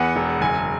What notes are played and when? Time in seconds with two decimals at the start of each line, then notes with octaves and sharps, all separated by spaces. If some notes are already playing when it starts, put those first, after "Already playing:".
Already playing: E2 B3 F#5
0.16 E1
0.41 F#1 G#5